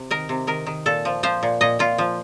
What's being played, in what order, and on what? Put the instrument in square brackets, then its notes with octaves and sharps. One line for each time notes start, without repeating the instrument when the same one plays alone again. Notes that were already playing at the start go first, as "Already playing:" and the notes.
Already playing: [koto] C3
D#3 A#4
C3
D#3 A#4
D#3
A#2 A4
F3
F3 C5
A#2
A#2 D#5
A#2 F4
F3